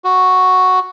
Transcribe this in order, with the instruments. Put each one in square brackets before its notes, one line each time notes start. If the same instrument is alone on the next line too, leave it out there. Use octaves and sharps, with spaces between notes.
[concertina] F#4